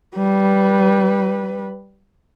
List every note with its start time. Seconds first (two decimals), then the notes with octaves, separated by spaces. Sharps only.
0.16 G3 B4